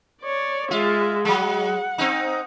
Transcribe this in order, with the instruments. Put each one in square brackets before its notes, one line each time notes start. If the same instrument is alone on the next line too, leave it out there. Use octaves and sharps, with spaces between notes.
[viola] C#5 D5
[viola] G#3 E5 [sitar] F4
[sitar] F#3 G#3 [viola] F#5
[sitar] C4 D#4